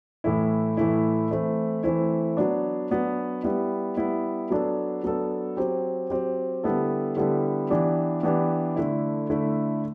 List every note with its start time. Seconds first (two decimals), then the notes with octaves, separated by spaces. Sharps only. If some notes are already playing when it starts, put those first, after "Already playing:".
0.24 A2 E3 A3 E4
0.77 A2 E3 A3 E4
1.31 E3 A3 C4 E4
1.83 E3 A3 C4 E4
2.37 F#3 B3 D4
2.90 F#3 B3 D4
3.43 G3 B3 E4
3.97 G3 B3 E4
4.50 F#3 B3 D4 A4
5.03 F#3 B3 D4 A4
5.57 F#3 C4 G4
6.10 F#3 C4 G4
6.64 D3 G3 B3 E4 A4
7.17 D3 G3 B3 E4 A4
7.70 E3 B3 D4 G4
8.23 E3 B3 D4 G4
8.76 D3 A3 E4
9.30 D3 A3 E4